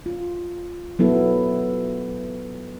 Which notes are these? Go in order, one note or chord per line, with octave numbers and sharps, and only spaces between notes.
F4
F#3 B3 E4 A4